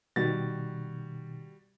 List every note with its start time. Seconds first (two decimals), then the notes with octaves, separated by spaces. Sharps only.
0.16 B2 D#3 G3 F#4 A6